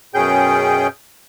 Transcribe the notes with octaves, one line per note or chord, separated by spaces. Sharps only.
F#2 B2 C#4 G#4 G5 G6